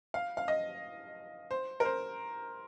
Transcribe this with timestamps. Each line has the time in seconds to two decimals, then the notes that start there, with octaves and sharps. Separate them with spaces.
0.14 F5
0.37 F5
0.48 D#5
1.51 C5
1.80 A#4
1.85 C5